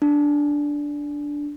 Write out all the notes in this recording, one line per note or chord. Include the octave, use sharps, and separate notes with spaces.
D4